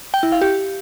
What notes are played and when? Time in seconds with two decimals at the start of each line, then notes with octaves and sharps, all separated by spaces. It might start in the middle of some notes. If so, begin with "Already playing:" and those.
0.14 G5
0.23 E4
0.32 F5
0.41 G4